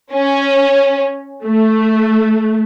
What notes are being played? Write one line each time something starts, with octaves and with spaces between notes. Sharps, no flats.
C#4
A3